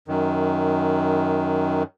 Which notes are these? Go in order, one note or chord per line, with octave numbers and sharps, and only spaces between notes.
F#2 D#3